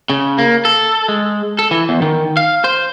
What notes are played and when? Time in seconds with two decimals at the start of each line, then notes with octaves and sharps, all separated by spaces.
0.10 C#3
0.38 A#3
0.65 A4
1.09 G#3
1.59 A4
1.71 E3
1.89 E2
2.02 D#3
2.37 F5
2.64 C5